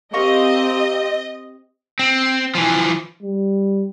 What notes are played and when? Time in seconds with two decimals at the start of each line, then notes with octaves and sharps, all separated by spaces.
0.14 C4 G4 A#4 D#5 F5 C#6
1.99 C4
2.55 E3 F3
3.23 G3